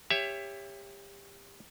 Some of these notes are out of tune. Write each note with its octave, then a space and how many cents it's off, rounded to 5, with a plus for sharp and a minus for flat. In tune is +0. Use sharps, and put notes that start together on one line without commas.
G4 +25 C#5 +0 E5 +15